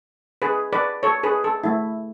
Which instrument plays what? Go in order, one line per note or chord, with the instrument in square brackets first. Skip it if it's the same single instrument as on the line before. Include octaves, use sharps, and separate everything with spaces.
[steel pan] G#4 B4
B4 D5
A4 C#5
G#4 B4
A4
A3 E4